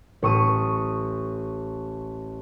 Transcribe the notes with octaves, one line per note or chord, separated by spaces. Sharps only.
A1 C#6 D#6